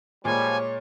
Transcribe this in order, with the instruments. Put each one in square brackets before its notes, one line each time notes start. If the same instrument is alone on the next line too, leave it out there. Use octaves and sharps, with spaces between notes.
[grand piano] A#2 G#3 [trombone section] F3 G3 [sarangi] C#5 [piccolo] G#5